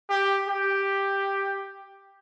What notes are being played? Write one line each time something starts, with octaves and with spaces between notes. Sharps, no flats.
G4
G4